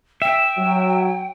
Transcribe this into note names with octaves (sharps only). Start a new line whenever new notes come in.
E5 G5
F#3